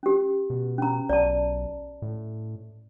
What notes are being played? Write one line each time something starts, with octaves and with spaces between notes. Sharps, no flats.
C#4 G4
B2
C#4 A#5
B1 D5 A5
A2